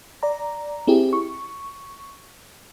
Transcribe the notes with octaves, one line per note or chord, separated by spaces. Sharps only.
D5 A#5
C4 E4 G4 G#4
C#6